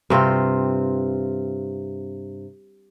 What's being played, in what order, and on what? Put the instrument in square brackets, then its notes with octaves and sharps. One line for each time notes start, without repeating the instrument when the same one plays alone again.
[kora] G2 C3 C4 F4